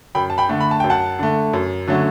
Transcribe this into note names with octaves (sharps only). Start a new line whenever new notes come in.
F#2 G5 B5
A5
G5 B5
D3 A3
B5
A5
F#2 G5
F#5 A5
D3 A3
F#2
D3 F#3 A3 C#4